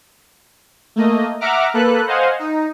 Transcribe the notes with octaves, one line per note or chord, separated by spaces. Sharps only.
A3 A#3 D#5
E5 F#5 A#5 D6 F6
A#3 A4 B4 F#6
C5 D#5 F5 F#5 G#5
D#4